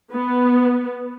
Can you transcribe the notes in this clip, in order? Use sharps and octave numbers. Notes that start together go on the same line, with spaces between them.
B3